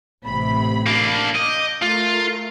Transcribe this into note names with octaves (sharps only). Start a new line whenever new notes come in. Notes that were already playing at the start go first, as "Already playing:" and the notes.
A1 C3 B5
A#3 D4
D#5 D6 G6
A3 F4 A#4